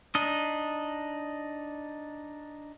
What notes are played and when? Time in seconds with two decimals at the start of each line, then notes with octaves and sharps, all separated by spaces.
0.15 D4 D#4 D#5